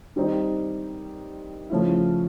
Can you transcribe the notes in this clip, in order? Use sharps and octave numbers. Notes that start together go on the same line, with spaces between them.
D#3 G3 C4 D#4
C#3 F3 A3 C#4 E4